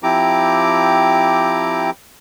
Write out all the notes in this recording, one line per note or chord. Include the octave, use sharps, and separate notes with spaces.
F3 C4 E4 G4 A#5 D6